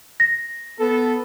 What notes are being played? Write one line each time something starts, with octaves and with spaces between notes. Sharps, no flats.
A#6
B3 A4